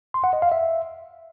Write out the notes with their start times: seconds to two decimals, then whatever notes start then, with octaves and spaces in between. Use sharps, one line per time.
0.14 C6
0.24 F#5
0.33 D#5
0.42 F5
0.52 E5